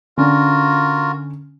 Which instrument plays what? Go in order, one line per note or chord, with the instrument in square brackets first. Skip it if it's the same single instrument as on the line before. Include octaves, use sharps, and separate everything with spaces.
[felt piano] D3 C#4 [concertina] F4 F#4 A#4